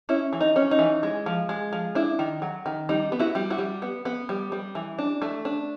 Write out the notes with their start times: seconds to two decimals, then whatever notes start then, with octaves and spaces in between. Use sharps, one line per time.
0.09 C#4 E4
0.33 E3
0.41 D#4
0.56 C#4
0.71 D#4
0.79 E3
1.03 G#3
1.26 F3
1.49 G#3
1.73 F3
1.95 D4 E4
2.19 D#3
2.42 F#3
2.66 D#3
2.89 G3 D#4
3.12 B3
3.19 E4 F#4
3.35 G3
3.50 E4 F#4
3.58 G3
3.82 B3
4.05 B3
4.29 G3
4.52 G3
4.75 E3
4.98 D4
5.22 A3
5.45 D4